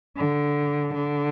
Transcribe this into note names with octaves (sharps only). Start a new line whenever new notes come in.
D3
D3